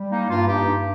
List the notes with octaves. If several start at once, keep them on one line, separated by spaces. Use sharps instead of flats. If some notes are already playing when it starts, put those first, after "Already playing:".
Already playing: G3
A#3 D#4
G2 F4
G2 D#4 G4
G2